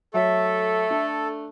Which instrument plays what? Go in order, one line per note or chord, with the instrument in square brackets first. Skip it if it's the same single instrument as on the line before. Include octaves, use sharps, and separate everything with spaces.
[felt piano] F#3 C#5 [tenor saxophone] A3 [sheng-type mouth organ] A4 [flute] E5
[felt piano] D4